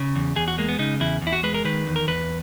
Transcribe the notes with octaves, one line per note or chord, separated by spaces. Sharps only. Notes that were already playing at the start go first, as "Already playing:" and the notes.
Already playing: C#3
E2
E2 G#4
F#4
G#3 A#3
B3
C#3 D#4
E2 E4
E2
E4
F#4
G#3 B4
A#4
D#3 B4
E2
A#4
E2 B4